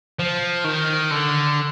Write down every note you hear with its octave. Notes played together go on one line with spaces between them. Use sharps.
F3
D#3
D3